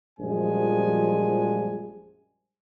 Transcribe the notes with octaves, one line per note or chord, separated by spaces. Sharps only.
A#1 F#2 F3 G3 G#3 G#5